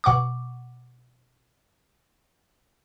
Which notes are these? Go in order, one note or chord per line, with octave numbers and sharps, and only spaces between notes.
B2 F#5 C#6 D6